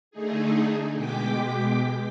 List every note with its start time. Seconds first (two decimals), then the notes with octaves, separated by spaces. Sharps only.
0.11 D3 A3 D#4 G#4
0.95 B2 G#3 G5 D6 B6